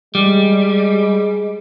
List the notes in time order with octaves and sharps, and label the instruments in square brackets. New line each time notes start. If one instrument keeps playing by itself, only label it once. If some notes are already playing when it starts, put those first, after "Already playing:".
[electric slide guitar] G3 [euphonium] G#3